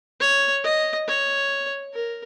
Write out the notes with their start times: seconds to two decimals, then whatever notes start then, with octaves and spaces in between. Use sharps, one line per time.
0.20 C#5
0.64 D#5
1.07 C#5
1.94 A#4